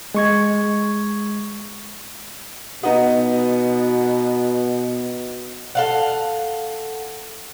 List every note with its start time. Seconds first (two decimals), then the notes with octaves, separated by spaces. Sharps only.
0.14 G#3 C#6 G#6
2.83 B2 B3 D#4
5.75 A4 F5 F#5